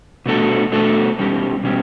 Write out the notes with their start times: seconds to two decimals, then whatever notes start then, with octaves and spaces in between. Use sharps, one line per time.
0.26 B2 A3 D4 F#4 A4
0.72 B2 A3 D4 F#4 A4
1.18 B2 G3 C#4 G4
1.63 B2 G3 C#4 G4